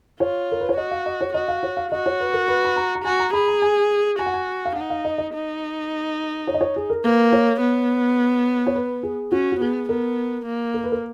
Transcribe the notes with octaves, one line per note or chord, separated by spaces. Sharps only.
F4 C#5
A#4
B4
C#5
F#4 D#5
F5
D#5
C#5
F#4 D#5
F5
C#5
F5
F#4 D#5
C#5
B4
A#4
B4
B5
A#5
A#5
F#4 G#5
A#5
G#4 B5
A#5
G#5
F#4 G#5
F#5
G#5
F5
D#4 F#5
F5
D#5
D#5
D#4
C#5
D#5
C#5
G#4
A#4
A#3 B4
C#5
B3
C#5
B4
G#4
C#4 F#4
F#4
B3 G#4
B3 A#4
A#3
A#4
B4
A#4